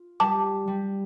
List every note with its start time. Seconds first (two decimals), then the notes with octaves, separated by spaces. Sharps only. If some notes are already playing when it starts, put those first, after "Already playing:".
Already playing: F4
0.20 G3 A5 D6
0.67 G3